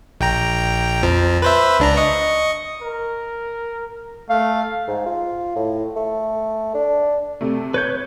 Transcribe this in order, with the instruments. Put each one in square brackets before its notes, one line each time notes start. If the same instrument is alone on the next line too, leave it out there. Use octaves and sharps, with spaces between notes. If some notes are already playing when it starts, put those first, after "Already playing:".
[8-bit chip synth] A#1 G5 A#5
F2 F3
B4 C5 E5
C#2 D4 A#5
D#5 C#6
[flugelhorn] A#4
[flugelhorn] A3 [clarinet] F5
[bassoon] G#2
F4
A2
A3
D4
[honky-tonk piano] C3 A3
[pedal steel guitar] B4 C#5 G6 [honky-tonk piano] G#6